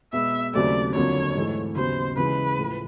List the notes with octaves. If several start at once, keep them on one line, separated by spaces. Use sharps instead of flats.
B2 G#3 B3 E5
D#2 C#3 F#3 A3 C4 D5
F2 D3 F#3 A#3 C#5
G#2 E3 A3
D#2 C#3 F#3 B3 C5
C#3 E3 G#3 B4
A2 F3 A3